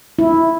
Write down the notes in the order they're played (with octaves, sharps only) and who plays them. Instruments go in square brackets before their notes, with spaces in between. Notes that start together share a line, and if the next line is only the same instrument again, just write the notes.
[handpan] E4